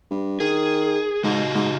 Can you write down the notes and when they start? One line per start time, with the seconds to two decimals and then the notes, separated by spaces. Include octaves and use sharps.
0.11 G2
0.40 D#3 G#4
1.24 G#2 C#3 F#4 D#5
1.54 G#2